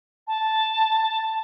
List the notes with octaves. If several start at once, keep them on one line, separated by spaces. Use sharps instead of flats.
A5